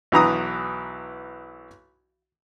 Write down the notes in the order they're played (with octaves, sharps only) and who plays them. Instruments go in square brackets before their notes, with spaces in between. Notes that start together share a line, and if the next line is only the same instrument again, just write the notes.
[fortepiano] B1 E3 A#5 D#6